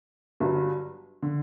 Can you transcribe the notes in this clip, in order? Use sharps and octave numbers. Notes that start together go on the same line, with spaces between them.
G1 G2 F#3
D3